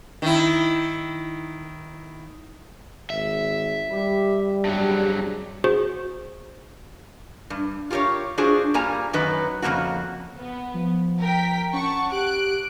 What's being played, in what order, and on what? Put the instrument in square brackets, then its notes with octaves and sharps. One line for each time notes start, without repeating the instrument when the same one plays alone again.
[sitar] D#3 E4
[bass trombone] G#1 [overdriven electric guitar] E5
[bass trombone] G3 [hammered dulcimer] G4 B4
[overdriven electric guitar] G2 F#3 [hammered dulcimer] C3 G#4
[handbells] F#4 G#4 C5
[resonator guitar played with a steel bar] G2
F4 G4 A4 A#4 C#5
D4 F4 F#4 G#4 C5
G2 G3 A#3 G#5 A#5
F#2 D#3 F#3 D#4 B4
F2 A#2 C#3 A#3 F#4
[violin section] B3
[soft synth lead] F3
[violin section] A#4 G5 B6
[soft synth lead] C#4 [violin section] F#5 A5 C#6
[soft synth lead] G4 [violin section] F#6 D7